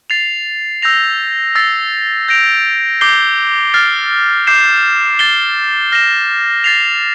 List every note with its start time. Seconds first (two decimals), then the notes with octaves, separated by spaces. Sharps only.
0.10 A6 C7 F7
0.82 E6 G6 A#6 F7
1.55 E6 A6 C7
2.28 G6 A#6 D7 F7
3.01 D6 G6 C7 G7
3.74 F6 A6 C7
4.47 D6 G6 C7 E7
5.19 A6 C7 G7
5.92 F6 A#6 E7 G7
6.64 A6 C7 F7